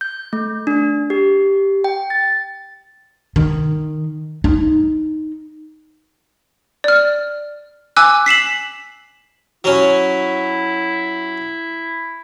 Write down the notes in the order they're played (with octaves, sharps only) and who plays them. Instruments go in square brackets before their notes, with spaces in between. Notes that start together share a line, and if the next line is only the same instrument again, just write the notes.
[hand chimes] G6
A3
D4
G4
G5
A6
[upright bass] D#3
D#4
[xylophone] D5 F6
G#5 D6 E6 F#6
B6 C7 E7 F#7
[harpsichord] F#3 C#4 [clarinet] E4